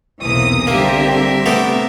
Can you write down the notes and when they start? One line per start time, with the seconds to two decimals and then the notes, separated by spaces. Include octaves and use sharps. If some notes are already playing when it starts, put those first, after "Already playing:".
0.22 B1 E2 C3 E3 A#3 D#6
0.67 D3 G3 A#3 C4 G4 A#4 E5
1.46 C3 A3 B3 G4